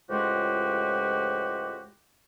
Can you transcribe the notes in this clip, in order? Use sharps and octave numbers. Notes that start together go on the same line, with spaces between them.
C#2 A2 F3 G#3 F#4 G4